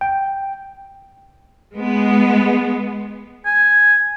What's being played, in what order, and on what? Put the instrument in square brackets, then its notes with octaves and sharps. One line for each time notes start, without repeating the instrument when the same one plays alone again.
[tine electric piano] G5
[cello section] G#3 B3
[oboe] G#5